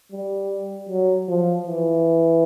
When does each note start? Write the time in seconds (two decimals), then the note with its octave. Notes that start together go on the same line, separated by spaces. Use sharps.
0.12 G3
0.89 F#3
1.28 F3
1.67 E3